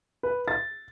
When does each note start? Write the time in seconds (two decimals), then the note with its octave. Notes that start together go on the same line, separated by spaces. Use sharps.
0.23 B4
0.48 A6